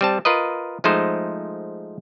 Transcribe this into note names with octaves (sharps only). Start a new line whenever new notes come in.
G3 C4 A5
F4 A#4 B4 D#5
F3 G#3 A3 D#4 C5